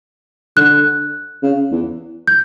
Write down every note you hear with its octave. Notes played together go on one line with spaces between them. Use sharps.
D3 F#6
C#3
E2
G6